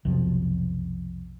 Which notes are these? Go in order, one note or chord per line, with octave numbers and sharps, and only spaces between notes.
B1 F2 C3 F3